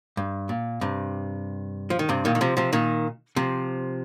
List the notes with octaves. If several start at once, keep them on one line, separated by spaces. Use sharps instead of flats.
G2
A#2
G2 C3
F3
D#3
G2 C3
A#2 D#3
D#3
C3 F3
C3 F3
A#2 D#3
C3 F3